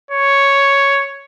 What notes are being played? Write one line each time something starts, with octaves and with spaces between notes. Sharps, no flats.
C#5